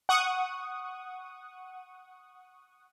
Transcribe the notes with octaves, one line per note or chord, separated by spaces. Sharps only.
F#5 C#6 D#6